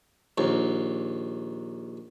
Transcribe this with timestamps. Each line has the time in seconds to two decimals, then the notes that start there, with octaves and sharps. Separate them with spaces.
0.38 A#1 D#2